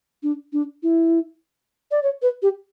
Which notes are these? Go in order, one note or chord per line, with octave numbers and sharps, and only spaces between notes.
D4
D4
E4
D5
C#5
B4
G4